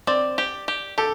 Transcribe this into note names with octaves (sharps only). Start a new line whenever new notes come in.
C4 D5
G4
G4
G4 A4